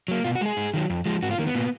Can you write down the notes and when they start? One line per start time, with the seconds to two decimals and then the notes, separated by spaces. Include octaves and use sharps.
0.08 F#3 A#3
0.24 B2 F4
0.35 F#4
0.41 G#3 G#4
0.57 G#2
0.74 D#3 F#3
0.90 F2
1.06 F3 G#3
1.22 G#2 F#4
1.31 F4
1.38 D#3 A#3
1.47 B3
1.55 A#2